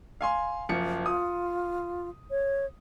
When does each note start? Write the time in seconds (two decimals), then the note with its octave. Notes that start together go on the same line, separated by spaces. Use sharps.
0.21 F5 G#5 C6
0.69 F#1 F3 C#7
1.06 F4 D#6
2.31 C#5